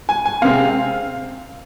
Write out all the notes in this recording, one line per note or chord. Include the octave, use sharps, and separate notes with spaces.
G#5
G#5
C3 G#3 C4 F5